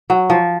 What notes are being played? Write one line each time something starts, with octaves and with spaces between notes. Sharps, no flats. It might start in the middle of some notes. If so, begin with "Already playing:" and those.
F#3
F3